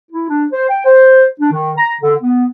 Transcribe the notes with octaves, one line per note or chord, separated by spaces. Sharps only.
E4
D4
C5
G5
C5
D4
D#3
A#5
D3
B3